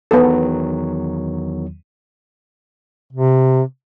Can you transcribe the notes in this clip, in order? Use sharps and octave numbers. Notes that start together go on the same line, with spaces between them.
E2 D#3 F#3 B3 A4
C3